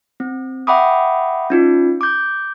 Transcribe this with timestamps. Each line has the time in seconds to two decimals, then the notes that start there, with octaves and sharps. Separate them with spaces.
0.20 C4
0.67 E5 F#5 G5 B5 D6 D#6
1.50 C#4 D#4 F4
2.01 D6 G6